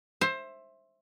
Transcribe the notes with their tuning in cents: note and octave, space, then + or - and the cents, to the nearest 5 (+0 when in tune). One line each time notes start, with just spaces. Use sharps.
C5 +20 E5 +0